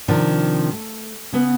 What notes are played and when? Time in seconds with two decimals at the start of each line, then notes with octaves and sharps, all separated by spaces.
0.08 C3 D#3 F3 D4
0.73 A3
1.33 C#3 B3